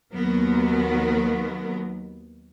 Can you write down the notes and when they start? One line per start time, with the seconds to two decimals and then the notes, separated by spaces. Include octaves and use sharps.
0.12 D#2 F#3 B3 A#4